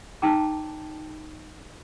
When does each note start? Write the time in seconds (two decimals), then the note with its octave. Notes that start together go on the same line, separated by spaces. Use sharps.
0.22 D#4 G5 A5 A#5 D6